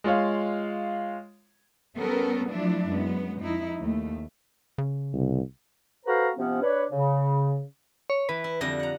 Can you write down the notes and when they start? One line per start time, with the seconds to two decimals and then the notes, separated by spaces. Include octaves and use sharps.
0.04 G#3 F4 C#5 F5
1.96 G3 B3 C#4 A4 A#4
2.48 F3 F#3 A3 D4 E4
2.88 F#2 G#3 B3
3.42 F2 D#4 E4
3.80 D#2 A3
4.78 C#3
5.13 C2
6.06 F#4 A4 B4 C5 F5 A#5
6.36 C3 F3 B3 C#4
6.61 D4 B4 C#5
6.91 C#3
8.10 C#5
8.29 E3 B4
8.44 E4
8.61 F2 D3 G3 A#6
8.79 F#5 A#5